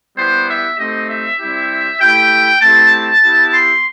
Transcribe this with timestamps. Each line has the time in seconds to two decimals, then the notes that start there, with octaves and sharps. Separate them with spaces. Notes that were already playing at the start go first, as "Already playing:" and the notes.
0.17 G3 B3 E4 G4 C5
0.48 E5
0.78 A3 C4 D#4 G4 D#5
1.09 E5
1.40 G3 C4 E4 G4
2.00 A3 E4 G4 G5
2.61 A3 C4 E4 G4 A5
3.22 B3 E4 G4
3.53 C6